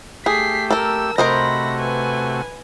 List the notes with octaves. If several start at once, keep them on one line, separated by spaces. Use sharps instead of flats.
A3 G4 G#4 B6 C7
A4 A#4 E6
C3 A3 F#4 A#4 C5 D#5 B5 A#6
B4 G#5